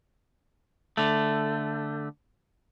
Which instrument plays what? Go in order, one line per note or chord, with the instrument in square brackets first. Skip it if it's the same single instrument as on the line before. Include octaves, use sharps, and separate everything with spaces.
[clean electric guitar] D3 A3